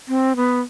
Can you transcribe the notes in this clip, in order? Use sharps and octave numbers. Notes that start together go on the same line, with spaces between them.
C4
B3